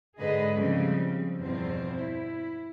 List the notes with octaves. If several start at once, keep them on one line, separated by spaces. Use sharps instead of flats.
G#2 D3 G#3 G#4 B4 D#5
C#3 F3 G3 C4
E2 G2 B2 F3 C4 C5
E4